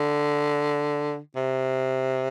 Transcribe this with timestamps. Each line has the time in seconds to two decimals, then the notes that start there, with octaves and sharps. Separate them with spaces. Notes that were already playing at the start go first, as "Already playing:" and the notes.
Already playing: D3
1.36 C3